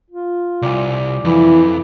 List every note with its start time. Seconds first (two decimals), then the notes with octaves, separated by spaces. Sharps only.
0.10 F4
0.62 C2 D5 G#5
1.25 F2 E3 E4